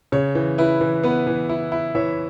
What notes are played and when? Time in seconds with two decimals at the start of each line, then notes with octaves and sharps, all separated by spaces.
0.12 C#3 C#5
0.35 E3
0.58 E4 B4
0.81 E3
1.03 B3 B4
1.27 E3
1.49 E4
1.72 E4
1.95 E3 C#5 E5